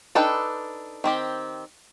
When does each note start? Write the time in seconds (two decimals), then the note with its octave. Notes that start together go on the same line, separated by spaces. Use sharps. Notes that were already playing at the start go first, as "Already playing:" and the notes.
0.15 D4 D#4 A4 B4 G5
1.04 D#3 C4 G4